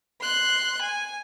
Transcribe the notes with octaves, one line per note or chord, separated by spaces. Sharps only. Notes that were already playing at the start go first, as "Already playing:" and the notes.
C6 F#6
G#5